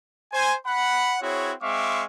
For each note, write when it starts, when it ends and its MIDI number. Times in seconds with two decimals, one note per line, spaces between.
0.33 0.55 72
0.33 0.55 80
0.67 1.17 78
0.67 1.17 83
1.22 1.53 60
1.22 1.53 64
1.22 1.53 66
1.22 1.53 68
1.22 1.53 73
1.62 2.03 56
1.62 2.03 60
1.62 2.03 76
1.62 2.03 77
1.62 2.03 85
1.62 2.03 86